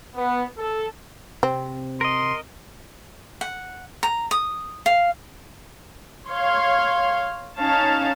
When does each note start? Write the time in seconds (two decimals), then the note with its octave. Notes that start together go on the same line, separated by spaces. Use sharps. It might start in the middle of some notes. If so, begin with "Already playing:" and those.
0.15 B3
0.58 A4
1.43 C3 C4
2.01 A#4 D#5 C6
3.41 F#5
4.03 A#5
4.31 D#6
4.86 F5
6.29 C#5 F5 C6
7.58 C#4 D#4 C#5 F5 A5